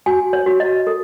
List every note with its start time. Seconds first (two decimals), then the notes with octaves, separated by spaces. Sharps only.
0.06 F#4 G#5
0.33 C#5
0.46 F#4
0.60 D#5
0.87 A4